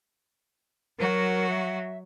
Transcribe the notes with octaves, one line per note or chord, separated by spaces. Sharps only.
F#3 F#4 A#4
E5